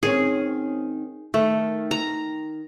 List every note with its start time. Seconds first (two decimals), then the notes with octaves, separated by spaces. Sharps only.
0.03 D#3 C4 C#4 G#4
1.34 D#3 A3
1.91 A#5